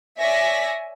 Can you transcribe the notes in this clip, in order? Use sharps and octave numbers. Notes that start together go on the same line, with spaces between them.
C#5 D5 E5 G#5 A#6 B6